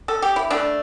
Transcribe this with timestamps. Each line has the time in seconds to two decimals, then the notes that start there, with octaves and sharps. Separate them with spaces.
0.08 A4
0.22 G4
0.36 E4
0.50 A3 D4